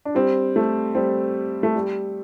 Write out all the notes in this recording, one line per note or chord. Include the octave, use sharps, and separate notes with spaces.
D4
G3 C4
A3
G3 C4
A3
G3